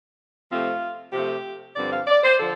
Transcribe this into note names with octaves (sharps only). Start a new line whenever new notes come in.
C3 F3 A3 C4 F4
C3 F3 A3 C4 G4
G2 D3 F3 C4 D5
F5
D5
C5
D3 F3 A4